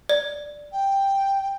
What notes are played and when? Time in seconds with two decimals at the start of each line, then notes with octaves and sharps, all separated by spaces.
0.09 D5
0.72 G5